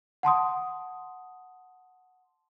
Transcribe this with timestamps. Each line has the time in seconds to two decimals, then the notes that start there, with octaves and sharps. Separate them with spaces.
0.23 F#5 A5 C6 D#6